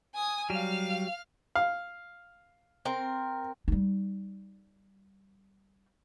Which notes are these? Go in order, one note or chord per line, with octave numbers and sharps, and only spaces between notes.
G#5 D#6
F#3 G3 F5 F6
F5
C4 A#4
G3 D#4